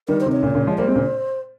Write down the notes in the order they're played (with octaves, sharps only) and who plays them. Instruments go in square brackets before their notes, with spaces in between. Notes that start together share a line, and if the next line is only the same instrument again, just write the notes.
[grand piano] D#3 G3 [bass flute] A#4
[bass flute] C5
[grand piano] C3 D#3
[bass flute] C#5
[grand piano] A#2 C#3
A#2 C#3
F3 G#3
[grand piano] G3 A#3 [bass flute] C5
[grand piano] G#3 C4
A#2 C#3